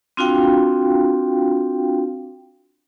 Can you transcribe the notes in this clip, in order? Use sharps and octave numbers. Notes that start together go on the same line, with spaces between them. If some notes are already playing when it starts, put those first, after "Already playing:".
C4 D4 F4 F#4 F5 G5